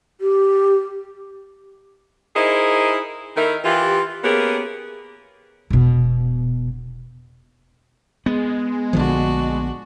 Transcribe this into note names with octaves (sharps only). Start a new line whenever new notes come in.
G4
D#4 E4 G#4 A#4 C5 D#5
D#3 D#4 E4 A4 A#4
E3 F4 G4
A#3 B3 C#4 G4 G#4
E1 B2
G#3 B3
A#1 D3 F3 D4 F#4